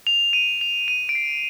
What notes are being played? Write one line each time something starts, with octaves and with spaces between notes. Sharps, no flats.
F7
D#7
F7
D#7
D7
C7